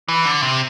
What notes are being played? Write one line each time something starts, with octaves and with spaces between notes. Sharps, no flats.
E3
D3
C3